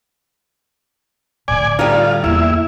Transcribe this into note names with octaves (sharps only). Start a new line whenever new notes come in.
A2 D3 D5 G#5
G3 A3 D#4 F4
E2 A#3 E4